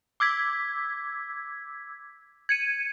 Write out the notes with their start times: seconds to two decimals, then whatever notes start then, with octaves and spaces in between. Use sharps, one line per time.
0.20 D6 E6 G#6 B6
2.49 G#6 C#7 D#7